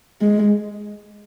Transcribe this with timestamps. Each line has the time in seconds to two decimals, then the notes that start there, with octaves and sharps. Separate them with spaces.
0.22 G#3